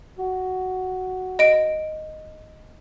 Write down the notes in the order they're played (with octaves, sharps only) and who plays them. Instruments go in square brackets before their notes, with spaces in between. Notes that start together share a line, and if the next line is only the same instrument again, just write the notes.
[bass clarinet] F#4
[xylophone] D#5 D7